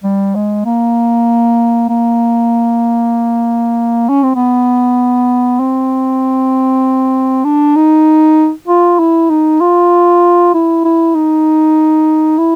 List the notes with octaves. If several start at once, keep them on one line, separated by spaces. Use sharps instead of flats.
G3
G#3
A#3
A#3
C#4
C4
B3
C4
D4
D#4
F4
E4
D#4
F4
E4
E4
D#4
E4